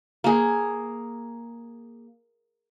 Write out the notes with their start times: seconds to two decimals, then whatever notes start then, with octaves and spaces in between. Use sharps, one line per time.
0.24 A#3 G#4